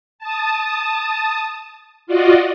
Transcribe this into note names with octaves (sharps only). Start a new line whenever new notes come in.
A5 D#6
F4 F#4 D5 D#5